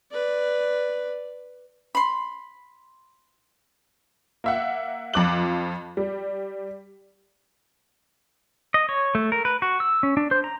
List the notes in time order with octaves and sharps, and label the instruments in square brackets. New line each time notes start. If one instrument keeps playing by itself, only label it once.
[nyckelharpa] B4 D5
[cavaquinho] B5 C6
[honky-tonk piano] A#3 E5 F#5
F2 F3 D6 F#6 F#7
G3
[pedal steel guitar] D#5
C#5
A3
A#4
B4
F#4
E6
C#4
D4
C5
A#5